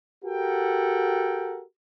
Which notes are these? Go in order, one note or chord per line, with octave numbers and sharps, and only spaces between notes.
F#4 G4 A4 A#4 F#5 G5